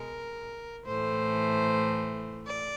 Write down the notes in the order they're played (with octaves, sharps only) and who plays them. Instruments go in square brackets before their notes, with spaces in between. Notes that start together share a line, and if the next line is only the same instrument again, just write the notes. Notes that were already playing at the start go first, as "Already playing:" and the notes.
Already playing: [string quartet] B2 G#3 A#4
A2 E3 A3 C5
D5